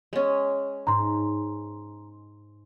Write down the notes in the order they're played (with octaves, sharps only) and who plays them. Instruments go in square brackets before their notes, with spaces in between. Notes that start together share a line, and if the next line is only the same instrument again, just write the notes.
[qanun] G#3 C#4
[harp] G#2 [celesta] A#5 C6